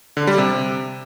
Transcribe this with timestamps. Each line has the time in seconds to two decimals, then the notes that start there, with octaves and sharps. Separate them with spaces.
0.17 D3
0.27 G3
0.38 C3